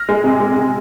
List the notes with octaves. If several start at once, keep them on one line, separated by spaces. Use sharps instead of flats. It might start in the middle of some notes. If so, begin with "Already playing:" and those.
Already playing: F6 A#6
G#3
C3
G#3
C3